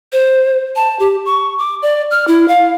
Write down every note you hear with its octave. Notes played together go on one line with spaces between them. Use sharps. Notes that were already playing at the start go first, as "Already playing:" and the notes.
C5
A5
G4
C#6
D6
D5
F6
E4
F5